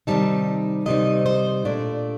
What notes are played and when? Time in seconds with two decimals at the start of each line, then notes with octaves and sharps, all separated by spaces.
0.07 C3 D#3 G3 C4 D#4 A5
0.86 C3 D#3 G3 C4 D#4 D#5
1.26 C5
1.65 A#2 A3 D4 D5